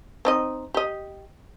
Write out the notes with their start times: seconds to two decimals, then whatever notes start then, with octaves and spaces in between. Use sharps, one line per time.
0.25 C4 D#4 D#5
0.74 G4 D#5